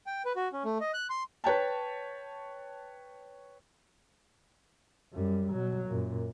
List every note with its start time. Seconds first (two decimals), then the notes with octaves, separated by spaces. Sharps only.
0.06 G5
0.25 B4
0.36 F#4
0.53 C#4
0.64 A3
0.81 D#5
0.94 F#6
1.10 C6
1.44 B4 C#5 G5 A5
5.13 F#2 G3
5.52 B2 F#3
5.87 F#2 A#2